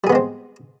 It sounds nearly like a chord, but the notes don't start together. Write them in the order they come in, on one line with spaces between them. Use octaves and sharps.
G3 G#4 B3 G#3 C4